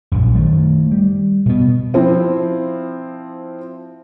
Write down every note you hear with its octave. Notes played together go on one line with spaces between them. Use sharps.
A#1 F#2
D#3 A3
G3
B2 B3
F3 C4 E4